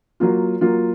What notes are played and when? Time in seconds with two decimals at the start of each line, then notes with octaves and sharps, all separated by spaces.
0.20 F#3 A#3 F4
0.61 F#3 A#3 F4